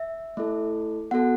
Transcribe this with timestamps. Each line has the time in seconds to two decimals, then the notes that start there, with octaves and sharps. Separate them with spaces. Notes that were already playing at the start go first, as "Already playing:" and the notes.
Already playing: E5
0.37 A3 E4 A4
1.11 B3 F#4 A4 F#5